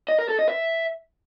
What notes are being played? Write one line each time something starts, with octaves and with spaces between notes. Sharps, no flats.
D#5
A#4
A4
D#5
E5